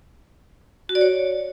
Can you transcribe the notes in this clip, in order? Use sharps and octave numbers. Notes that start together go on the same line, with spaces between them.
F#4
D5
C#5